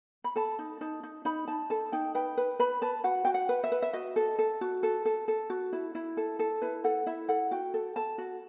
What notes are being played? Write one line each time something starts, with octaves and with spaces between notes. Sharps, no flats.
B5
A4 A5
D#4
D#4 A5
D#4
D#4 B5
D#4 A5
A4 A5
D#4 G5
B4 G5
B4
B4 B5
B4 A5
F#4 F#5
F#4 G5
F#5
B4
E5
B4
E5
F#4 D#5
A4
A4
F#4
A4
A4
A4
F#4
E4
E4
A4
A4
E4 B4
A4 F#5
E4 E5
A4 F#5
F#4 G5
A4
A4 A5
F#4